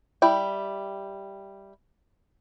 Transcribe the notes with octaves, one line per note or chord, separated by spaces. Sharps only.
G3 E4 G5